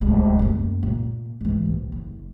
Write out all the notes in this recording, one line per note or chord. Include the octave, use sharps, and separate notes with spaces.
D1 G#3
F#2 A#3
A#2
G#2 E3
A#1
F#1